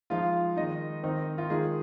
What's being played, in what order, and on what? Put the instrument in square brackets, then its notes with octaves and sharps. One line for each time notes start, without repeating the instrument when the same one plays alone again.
[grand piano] F3 G#3 D#4 F4 F5
D#3 G#3 D#4 D#5
D#3 C4 D#4
F4
D#3 G#3 D#4 G#4